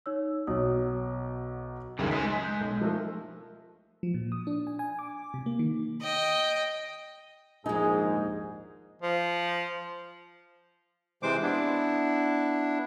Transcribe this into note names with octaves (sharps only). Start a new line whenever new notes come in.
D#4 C#5 E6
B1 F#3 C#5 D#6
C#2 F#2 D#3 F3 G3 G#3
G#3 C5 G#5 C6 D#6 B6
G#3
F#6 G6
B1
F3 A3 A#4
F3
A#2
D#6
D4
G#5
G#5
D6
C3
A#3
D#3
D#5 G5
A#1 D#2 G#2 G#3 D#4 G#4
F3
C3 E3 G#3 C5 D6
B3 D4 E4